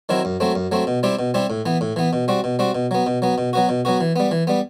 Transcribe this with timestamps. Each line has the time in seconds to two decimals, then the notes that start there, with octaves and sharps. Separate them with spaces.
0.09 D#3 F#3 C4 E4
0.25 F#2
0.40 F#3 A3 C4
0.55 F#2
0.72 F#3 A3 C4
0.87 B2
1.03 G3 C4 E4 G4
1.19 B2
1.34 G3 C4 E4 G4
1.50 A2
1.66 E3 B3
1.81 A2
1.96 E3 B3
2.13 B2
2.28 G3 C4 F#4
2.44 B2
2.59 G3 C4 F#4
2.75 B2
2.91 F#3 B3
3.07 B2
3.22 F#3 B3
3.38 B2
3.53 F#3 B3 F#4
3.69 B2
3.85 F#3 B3 F#4
4.01 E3
4.16 G3 B3
4.31 E3
4.47 G3 B3